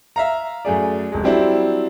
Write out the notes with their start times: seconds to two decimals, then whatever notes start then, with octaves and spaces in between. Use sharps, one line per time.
0.16 E5 F5 A#5
0.65 F#2 A3 G#4 D5
1.12 F1 G#3
1.24 F#3 G3 C4 D4 E4